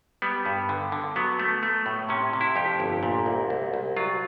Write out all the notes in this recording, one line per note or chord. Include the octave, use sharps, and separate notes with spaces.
G3 B3
G2
D3
D3
F#3 B3
A3
A3
A2
C3 C#4
C3
E4
F2 G4
G1
A#2
C2
C2
C2
F#3 F4